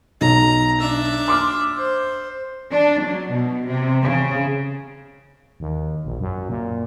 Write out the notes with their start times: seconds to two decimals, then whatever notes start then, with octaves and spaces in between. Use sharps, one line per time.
0.21 B1 A#5
0.81 D4 E5
1.28 C6 D6 F6
1.77 C5
2.72 D4
3.02 F#3
3.32 B2
3.67 C3
4.04 C#3
5.60 D#2
6.05 A#1
6.20 F#2
6.49 A#2